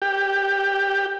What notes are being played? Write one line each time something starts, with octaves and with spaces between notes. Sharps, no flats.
G4